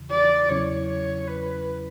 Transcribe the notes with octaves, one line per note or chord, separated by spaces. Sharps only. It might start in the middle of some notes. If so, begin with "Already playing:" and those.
Already playing: E2 C#3 E3
D5
E2 C#3 F#3 C#4 E4 C#5
C#5
B4